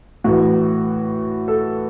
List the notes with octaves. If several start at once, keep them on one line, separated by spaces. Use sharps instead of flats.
A2 E3 F#4
A4